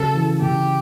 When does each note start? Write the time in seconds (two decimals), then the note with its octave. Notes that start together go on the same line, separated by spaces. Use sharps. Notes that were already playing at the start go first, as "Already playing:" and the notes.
Already playing: C#3 F#3 A4
0.14 E3
0.42 C#3 G4